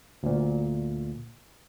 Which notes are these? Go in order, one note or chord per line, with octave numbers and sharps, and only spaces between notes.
D2 A#2